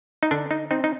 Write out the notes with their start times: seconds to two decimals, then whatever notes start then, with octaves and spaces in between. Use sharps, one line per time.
0.23 D#4
0.31 D3 D4
0.51 D#4
0.71 C4 D#4
0.84 D#4